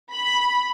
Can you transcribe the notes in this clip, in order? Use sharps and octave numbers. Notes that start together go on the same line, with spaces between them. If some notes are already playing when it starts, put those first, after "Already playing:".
B5